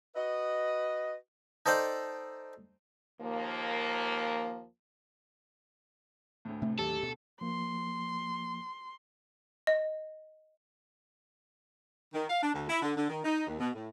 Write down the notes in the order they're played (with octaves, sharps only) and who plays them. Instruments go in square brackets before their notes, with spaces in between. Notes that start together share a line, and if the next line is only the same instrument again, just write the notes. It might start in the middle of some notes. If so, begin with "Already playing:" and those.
[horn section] F#4 B4 D#5
[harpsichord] D#4 A4 C5 D5 G5
[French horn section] D#2 F3 A#3
[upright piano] D2 A2
[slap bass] C3 [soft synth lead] A3
[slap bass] D#2 D#3 F#3 [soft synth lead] G4 [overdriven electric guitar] A4
[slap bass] D2 B2
[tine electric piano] F3 A#3 [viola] C6
[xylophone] D#5
[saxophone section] D#3
F5
D4
D2
E4
D3
D3
D#3
D#4
D#2
B2
A2